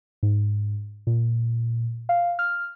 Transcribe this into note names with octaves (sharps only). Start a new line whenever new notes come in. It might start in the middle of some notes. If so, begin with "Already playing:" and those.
G#2
A#2
F5
F6